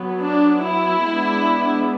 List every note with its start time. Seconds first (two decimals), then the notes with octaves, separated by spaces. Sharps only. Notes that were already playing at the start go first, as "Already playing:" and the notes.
Already playing: F#3 B3
0.20 D4
0.63 E4
1.06 G#3 B3 D4